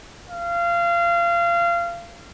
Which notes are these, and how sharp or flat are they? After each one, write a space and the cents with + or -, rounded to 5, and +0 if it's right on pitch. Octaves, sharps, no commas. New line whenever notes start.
F5 -25